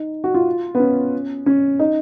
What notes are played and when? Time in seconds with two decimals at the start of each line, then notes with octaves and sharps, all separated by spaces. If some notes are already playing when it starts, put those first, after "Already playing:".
Already playing: D#4
0.24 F#4
0.34 F4
0.75 B3
0.80 C#4
1.46 C#4
1.79 D#4